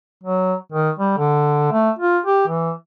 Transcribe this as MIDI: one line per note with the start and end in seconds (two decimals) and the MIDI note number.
0.24 0.55 54
0.72 0.91 51
0.99 1.13 55
1.18 1.67 50
1.72 1.91 57
1.99 2.19 65
2.26 2.46 67
2.48 2.72 52